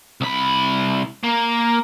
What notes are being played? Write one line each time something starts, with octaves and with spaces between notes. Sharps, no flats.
C2 B5
A#3